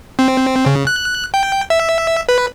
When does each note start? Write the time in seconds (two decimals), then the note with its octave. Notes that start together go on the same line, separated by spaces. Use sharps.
0.19 C4
0.66 C#3
0.87 F#6
1.34 G5
1.70 E5
2.29 B4